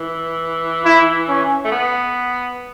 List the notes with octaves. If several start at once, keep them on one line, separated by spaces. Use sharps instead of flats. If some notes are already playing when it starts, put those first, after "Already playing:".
Already playing: E3
E4
C#4
A3
B3